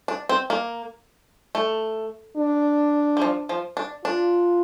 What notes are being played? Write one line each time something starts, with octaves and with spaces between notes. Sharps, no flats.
D4
C4
A#3
A3
D4
G3
F3
F3
D4
D4 F4